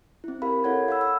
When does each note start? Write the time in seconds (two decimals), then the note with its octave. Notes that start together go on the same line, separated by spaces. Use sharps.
0.24 C4 E4
0.42 G4 A#4 F5 B5
0.64 E4 A4 C#5 F#5 G#6
0.88 F5 F#5 B5 E6
1.01 E6